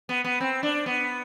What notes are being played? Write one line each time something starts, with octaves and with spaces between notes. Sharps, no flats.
B3
B3
C4
D4
B3